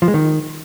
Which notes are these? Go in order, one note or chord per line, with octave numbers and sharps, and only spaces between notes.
F3
G#3
D#3